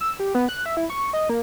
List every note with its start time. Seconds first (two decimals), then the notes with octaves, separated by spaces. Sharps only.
0.01 E6
0.20 G4
0.35 B3
0.49 F#6
0.66 E5
0.77 E4
0.90 C#6
1.13 D#5
1.29 A#3